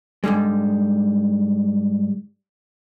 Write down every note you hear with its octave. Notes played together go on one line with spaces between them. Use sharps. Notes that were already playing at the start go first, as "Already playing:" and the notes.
G#2 B2 D3 G3 G#3